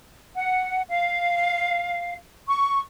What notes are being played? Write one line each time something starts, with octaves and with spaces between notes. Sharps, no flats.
F#5
F5
C#6